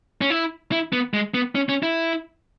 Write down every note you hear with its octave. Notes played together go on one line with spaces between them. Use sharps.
C#4
E4
E4
B3
G#3
B3
C#4
C#4
E4